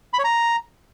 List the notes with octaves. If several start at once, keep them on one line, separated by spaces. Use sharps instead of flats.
B5
C#5
A#5